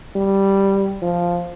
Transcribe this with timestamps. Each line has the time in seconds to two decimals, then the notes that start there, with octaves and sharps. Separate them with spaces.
0.16 G3
1.02 F3